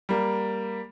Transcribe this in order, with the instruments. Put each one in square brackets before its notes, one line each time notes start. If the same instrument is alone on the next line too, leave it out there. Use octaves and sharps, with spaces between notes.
[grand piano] G3 A#3